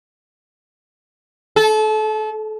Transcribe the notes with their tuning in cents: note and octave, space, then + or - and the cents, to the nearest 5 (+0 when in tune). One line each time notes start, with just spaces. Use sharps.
A4 -30